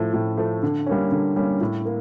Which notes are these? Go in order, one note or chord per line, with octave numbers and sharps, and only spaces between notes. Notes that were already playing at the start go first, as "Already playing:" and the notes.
Already playing: A2 F3 A3
A2
F3 A3
D3
G3 A#3 C#4
D3
G3 A#3 C#4
A2
A#3